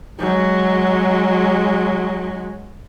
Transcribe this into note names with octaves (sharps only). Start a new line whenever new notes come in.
F#3 G#3